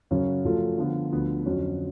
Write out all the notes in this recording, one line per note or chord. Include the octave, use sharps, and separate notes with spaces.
F#2 C#3 F#3 C#4 F#4
F#2 F3 A3 F4
D3 F3 B3 F4
D2 D3 F3 B3
F2 D3 F#3 C#4 F#4